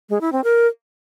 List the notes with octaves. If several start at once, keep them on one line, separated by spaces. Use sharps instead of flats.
G#3
E4
C4
A#4